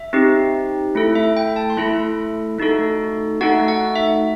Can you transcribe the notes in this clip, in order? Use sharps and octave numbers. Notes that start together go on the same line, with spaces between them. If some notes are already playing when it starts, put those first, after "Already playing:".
Already playing: E5
C4 D#4 G4
A3 E4 A4
E5
G5
A5
C6
A3 E4 A4 B5
A3 D#4 F#4 A4
A3 D#4 F#4 A4 F#5
F#5
E5